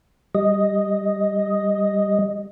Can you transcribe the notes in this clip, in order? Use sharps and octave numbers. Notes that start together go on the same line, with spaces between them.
G3 D#5